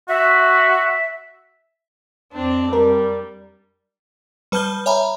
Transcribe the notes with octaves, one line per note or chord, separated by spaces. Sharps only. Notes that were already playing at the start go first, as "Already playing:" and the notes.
F#4 E5
F2 C4 D4
G3 A#4
G3 B4 A5 F6 G6 G7
C#5 E5 G#5 A#5 B5